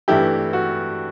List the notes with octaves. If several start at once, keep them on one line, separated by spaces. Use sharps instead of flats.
G2 E3 A3 E4 G4
F#4